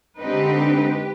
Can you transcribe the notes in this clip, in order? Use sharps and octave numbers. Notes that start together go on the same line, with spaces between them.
D3 G#3 C4 D#4 G4 B4